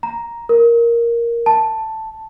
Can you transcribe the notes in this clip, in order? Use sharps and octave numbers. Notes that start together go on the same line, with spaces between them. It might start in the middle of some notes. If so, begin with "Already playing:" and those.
A#5
A#4
A5